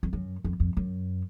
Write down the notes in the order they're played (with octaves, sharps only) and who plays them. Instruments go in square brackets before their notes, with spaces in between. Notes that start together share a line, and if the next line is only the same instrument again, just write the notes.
[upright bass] F2
F#2
F2
F2
F#2